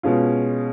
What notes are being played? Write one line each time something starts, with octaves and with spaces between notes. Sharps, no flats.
B2 G#3 C#4 F4